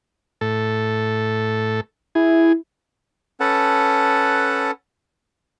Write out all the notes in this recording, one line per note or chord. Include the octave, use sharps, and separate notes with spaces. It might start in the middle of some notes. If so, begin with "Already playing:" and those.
A2 A4
E4 G#4
C#4 A4 B4 F#5 A5